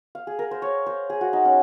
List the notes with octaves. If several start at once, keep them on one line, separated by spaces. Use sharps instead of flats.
F5
G#4
A#4
C5
C#5
C5
G#4
F#4
D#4
C#4